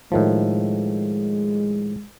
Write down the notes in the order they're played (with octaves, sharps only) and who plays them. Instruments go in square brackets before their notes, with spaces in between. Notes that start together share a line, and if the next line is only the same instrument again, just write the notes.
[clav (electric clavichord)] A2 D#3 F3 [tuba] G#3